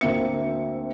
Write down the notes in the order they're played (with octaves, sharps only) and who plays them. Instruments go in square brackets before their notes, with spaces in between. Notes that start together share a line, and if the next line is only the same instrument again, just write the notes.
[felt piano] D2 A#3 C4 E5 C#7